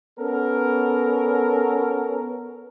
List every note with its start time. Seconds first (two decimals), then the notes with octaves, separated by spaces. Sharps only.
0.20 B3 C#4 A4 A#4